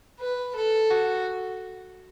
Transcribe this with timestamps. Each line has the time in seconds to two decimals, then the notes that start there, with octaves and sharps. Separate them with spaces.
0.19 B4
0.56 A4
0.91 F#4